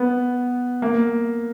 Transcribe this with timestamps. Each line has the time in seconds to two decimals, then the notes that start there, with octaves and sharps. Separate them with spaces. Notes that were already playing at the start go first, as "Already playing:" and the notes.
Already playing: B3
0.82 A#3